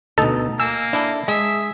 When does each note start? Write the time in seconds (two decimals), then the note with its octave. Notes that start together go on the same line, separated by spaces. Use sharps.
0.18 D2 B2 D#4 A4
0.60 A#3 G#5 E6
0.93 D4 E4 A4
1.28 G#3 G#4 E5